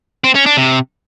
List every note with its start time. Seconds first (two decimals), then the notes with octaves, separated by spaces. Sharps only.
0.24 C4
0.35 C#4
0.46 D4
0.57 C3